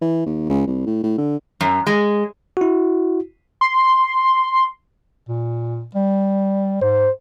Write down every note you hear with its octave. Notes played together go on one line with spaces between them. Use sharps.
E3
D#2
C#2
C2
A2
A2
D3
F#2
G#3
E4 F#4
C6
A#2
G3
G#2 C5